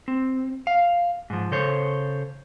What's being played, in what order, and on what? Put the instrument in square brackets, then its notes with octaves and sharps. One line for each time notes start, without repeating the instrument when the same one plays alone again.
[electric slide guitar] C4
F5
G#2 F3
C#3 A4 C5 C#5